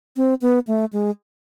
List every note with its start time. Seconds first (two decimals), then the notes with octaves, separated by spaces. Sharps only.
0.17 C4
0.41 B3
0.67 A3
0.93 G#3